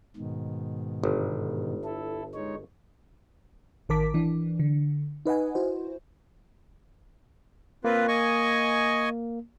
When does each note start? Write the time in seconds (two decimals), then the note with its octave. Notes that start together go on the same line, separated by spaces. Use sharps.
0.17 G#2 B2 D#3
1.04 G1
1.84 E4 A4
2.34 G#3 D#4 C#5
3.89 A1 D#3 A#4 A5 D6 B6
4.14 E3 D4
4.59 D3
5.26 D#4 B4 D#5 F#5 G#5
5.55 E4 F#4 C5
7.85 A#3 C4 F4 B4
8.08 D#5 G#5 C#6